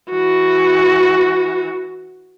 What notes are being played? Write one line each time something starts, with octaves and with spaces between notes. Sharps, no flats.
E3 F#4